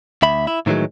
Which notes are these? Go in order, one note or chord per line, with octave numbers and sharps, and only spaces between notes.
D2 E5 B5
E4
A2 D#3 E3 F#3 G#3